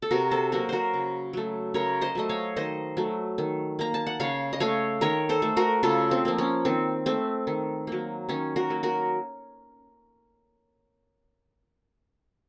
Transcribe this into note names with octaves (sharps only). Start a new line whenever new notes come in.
A4
C3 F#4 A#4
A4 C5
F#3 A#3 F#4 A#4
F#4 A#4 C5
C#3
F#3 A3
C#3 A#4 C#5
C5 D#5
F#3 A3 D#5
C#5 F5
D#3 C5 D#5
F#3 A3
D#3
A#3 A#5
A5
F#5
C#3 C#5 F5
D#5
A3 C#5 F5
D#3 A#4 C#5
A4 C5
A3
F#4 A#4
C#3 F4 A4
C4
F3 A#3
C#4
D#3 C4
A3 C4
D#3
F#3 A#3
D#3 C#4
F#4 A#4
F#3 A#3
F#4 A#4